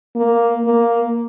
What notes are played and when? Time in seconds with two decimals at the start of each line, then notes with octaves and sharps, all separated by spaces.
0.16 A#3
0.65 A#3